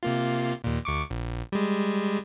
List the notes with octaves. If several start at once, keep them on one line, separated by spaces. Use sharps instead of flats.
C3 A#3 F4
D#2 A#2
D2 C#6 D6
A#1
G3 G#3